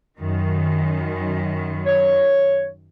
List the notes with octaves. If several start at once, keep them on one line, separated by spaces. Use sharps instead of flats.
F#2 D#3
C#5